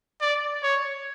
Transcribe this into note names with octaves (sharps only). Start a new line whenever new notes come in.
D5
C#5